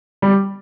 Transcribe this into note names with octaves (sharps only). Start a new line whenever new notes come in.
G3